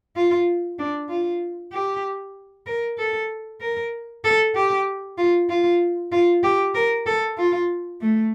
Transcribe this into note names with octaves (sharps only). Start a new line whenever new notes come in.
F4
D4
F4
G4
A#4
A4
A#4
A4
G4
F4
F4
F4
G4
A#4
A4
F4
A3